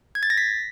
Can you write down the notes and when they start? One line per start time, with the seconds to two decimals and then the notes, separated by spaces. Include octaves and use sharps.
0.15 G#6
0.23 A6
0.30 A#6
0.38 B6